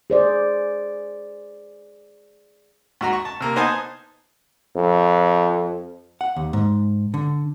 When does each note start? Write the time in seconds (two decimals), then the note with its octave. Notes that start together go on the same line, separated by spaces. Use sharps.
0.10 G#4 C5 D5
3.01 G#2 F#4 A#5
3.13 C#6
3.25 A5
3.40 C3 A#3
3.56 B3 D#4 C5 D#5 G#5 A5
4.76 F2
6.21 F#5
6.36 D#2
6.53 G#2
7.14 D3